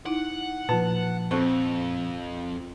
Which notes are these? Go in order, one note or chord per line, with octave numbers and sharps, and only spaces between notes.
D#4 E4 F#5
A#2 F3 B4 A5
F2 C4 A4 A5 C#6